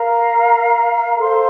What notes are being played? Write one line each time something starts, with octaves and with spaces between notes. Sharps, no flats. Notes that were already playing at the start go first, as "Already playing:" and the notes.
Already playing: A#4 F5 A#5
A4 C5 F5 C6